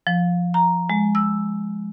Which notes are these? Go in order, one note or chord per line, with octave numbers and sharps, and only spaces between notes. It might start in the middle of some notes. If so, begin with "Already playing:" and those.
F3
A#5
G#3
E6